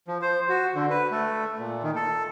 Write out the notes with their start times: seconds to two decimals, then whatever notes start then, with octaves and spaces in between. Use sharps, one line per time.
0.08 F3
0.22 C5
0.49 F#4
0.75 D3
0.90 B4
1.11 A3
1.59 A#2
1.83 D#3
1.96 A4